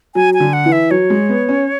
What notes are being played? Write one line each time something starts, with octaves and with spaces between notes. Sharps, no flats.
F#3 G#5
G#5
D3
F#5
E3
E5
F#3 C#5
G#3
B3
C#4